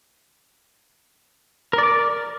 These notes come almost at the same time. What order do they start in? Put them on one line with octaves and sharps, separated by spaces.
A#4 D5 D6